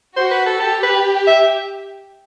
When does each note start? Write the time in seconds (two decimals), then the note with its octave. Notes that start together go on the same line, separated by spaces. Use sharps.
0.16 F#4 C5
0.31 B4
0.46 A4
0.60 G4 A4
0.83 B4
1.27 E5